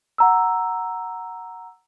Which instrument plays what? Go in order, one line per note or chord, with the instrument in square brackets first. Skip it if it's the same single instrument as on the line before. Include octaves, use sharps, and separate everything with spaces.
[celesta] F#5 A#5 E6